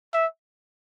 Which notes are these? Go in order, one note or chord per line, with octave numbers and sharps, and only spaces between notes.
E5